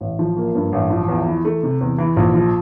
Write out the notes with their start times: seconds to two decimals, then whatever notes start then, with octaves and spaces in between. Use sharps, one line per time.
0.01 A1
0.19 F3
0.37 A#3
0.55 G2
0.73 A1
0.90 F3
1.08 E2
1.27 E3
1.45 A3
1.63 C3
1.81 E2
1.98 E3
2.17 A#1
2.34 F3